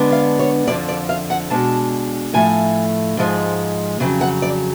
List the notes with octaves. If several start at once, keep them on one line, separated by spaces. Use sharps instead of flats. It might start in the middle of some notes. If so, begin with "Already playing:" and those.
Already playing: D3 G#3 B3 D4
F5
C#5
F2 D3 F3 D5
D5
F5
F#5
B2 G#3 D4 A5
A2 F3 A3 G#5
G#2 F3 G#3
F2 C#3 F#3
F#5
D5